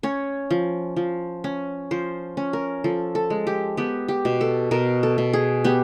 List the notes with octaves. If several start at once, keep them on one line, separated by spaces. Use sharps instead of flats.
C#4 C#5
F3
F3
C#4
F3 C5
C#4
A#4
F3 A4
A4
G#3
G4
B3 G4
G4
B2
A4
B2 A#4
A4
B2
G#4
B3 G4